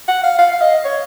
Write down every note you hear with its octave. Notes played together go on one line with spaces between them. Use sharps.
F#5
F5
F5
F5
D#5
C#5